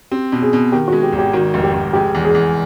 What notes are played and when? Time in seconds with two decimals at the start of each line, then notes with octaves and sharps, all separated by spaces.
0.11 C4 G4
0.32 B2
0.42 G#4
0.53 B2
0.72 D#3 G4
0.88 G#3 F#4
1.03 G4
1.12 G#1
1.19 G4
1.33 D#3 F#4
1.54 F1
1.63 G4
1.74 F1
1.93 G#3 G4
2.15 E2
2.25 G#4
2.35 E2